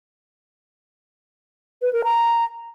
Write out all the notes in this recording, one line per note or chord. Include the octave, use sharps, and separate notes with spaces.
B4
A#4
A#5